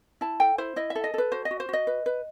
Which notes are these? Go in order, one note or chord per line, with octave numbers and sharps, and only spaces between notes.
E4 A5
A4 G5
E4 C5
E4 D#5
E5
A4
D#5
A4 B4
F#4 C5
D#5
F#4
C5
F#4 D#5
B4
B4